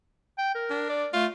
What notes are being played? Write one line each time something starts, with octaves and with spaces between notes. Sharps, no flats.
G5
A#4
D4
D5
A3 F4